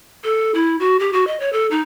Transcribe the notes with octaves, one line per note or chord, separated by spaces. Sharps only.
A4
E4
F#4
G4
F#4
D#5
C#5
A4
D#4